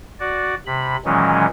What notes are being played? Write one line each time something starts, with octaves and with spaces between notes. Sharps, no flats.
F#4 D5
C3 B5
A#2 D#3 E3 F#3 G#3 C#4